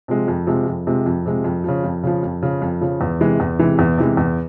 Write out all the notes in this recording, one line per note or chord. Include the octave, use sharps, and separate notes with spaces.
C3 F3 G#3
F2
C3 F3 G#3
F2
C3 F3 G#3
F2
C3 F3 G#3
F2
C#3 F3
F2
C#3 F3
F2
C#3 F3
F2
C#3 F3
E2
C3 E3 G#3
E2
C3 E3 G#3
E2
C3 E3 G#3
E2